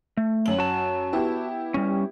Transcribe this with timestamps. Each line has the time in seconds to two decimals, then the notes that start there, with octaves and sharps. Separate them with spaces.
0.17 A3
0.46 F#2 F#7
0.58 F#4 A5
1.13 B3 E4 G4
1.74 G3 C#4